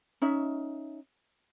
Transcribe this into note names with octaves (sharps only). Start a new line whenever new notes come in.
C#4 D#4 E5